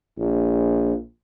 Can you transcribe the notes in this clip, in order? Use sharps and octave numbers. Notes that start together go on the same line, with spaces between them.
A#1